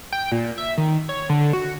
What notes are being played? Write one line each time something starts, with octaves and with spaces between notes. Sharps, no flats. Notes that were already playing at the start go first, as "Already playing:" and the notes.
G5
A#2
E5
D#3
C#5
D3
F#4